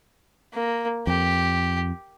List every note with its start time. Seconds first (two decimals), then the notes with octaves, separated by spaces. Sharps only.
0.53 A#3
1.07 F2 G4